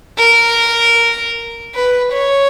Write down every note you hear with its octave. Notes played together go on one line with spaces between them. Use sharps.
A#4
B4
C#5